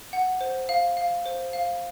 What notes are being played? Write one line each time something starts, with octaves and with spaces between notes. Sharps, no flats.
F#5
C5
F5
F5
C5
F5